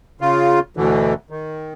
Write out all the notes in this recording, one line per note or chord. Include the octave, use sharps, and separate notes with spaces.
C#3 F4
D2 B2 D3 E3
D#3